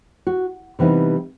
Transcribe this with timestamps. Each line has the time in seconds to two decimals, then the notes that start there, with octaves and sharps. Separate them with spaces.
0.27 F#4
0.79 C3 E3 G3 B3 D#4